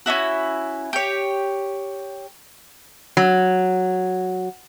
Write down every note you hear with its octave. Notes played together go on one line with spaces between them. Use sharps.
C#4 D4 E4 F#4
G4 C#5
F#3